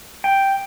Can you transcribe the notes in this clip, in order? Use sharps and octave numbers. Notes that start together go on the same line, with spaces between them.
G5